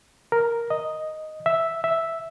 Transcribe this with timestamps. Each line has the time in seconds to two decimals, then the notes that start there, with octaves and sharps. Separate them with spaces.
0.32 A#4
0.70 D#5
1.46 E5
1.84 E5